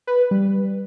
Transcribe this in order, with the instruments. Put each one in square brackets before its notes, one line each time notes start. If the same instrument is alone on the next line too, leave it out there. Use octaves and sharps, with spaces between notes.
[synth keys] B4
G3